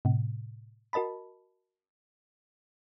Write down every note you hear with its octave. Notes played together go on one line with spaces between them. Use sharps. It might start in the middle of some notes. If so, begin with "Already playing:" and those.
A2 C3
F#4 A#4 D#5 A5 B5